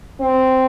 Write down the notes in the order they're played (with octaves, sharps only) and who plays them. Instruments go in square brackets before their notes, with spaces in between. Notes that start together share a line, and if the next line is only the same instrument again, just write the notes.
[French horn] C4